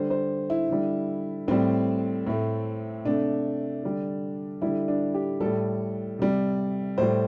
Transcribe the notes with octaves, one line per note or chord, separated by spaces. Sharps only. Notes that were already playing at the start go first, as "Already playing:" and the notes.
Already playing: D3 G3 C5
C5
E4
D3 G3
A2 G3 C4
A2 A3
C3 A3 D4
D3 G3
D3 G3 E4
D4
G4
A2 G3 A4
C3 G3
A2 G3 C5